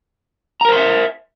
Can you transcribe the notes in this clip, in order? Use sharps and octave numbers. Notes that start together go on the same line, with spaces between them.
A#4 C5 E5 A#5 C6